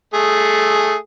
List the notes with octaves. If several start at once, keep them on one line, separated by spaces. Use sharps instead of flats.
A3 G#4